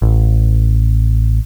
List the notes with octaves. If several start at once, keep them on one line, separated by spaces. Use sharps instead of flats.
A1